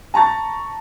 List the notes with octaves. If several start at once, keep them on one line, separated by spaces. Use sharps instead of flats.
A5 A#5 C#6 A6